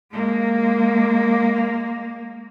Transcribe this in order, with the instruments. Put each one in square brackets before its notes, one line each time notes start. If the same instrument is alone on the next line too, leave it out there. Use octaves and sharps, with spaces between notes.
[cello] G#3 A#3